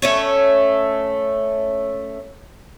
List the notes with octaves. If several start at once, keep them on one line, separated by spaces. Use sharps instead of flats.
A3 C#4 C#5